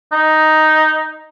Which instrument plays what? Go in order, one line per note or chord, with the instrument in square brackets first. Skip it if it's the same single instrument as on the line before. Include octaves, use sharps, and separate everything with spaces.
[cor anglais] D#4